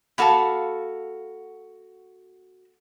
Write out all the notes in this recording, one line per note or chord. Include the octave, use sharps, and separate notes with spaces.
A#3 F#4 A4 F5 A5 B5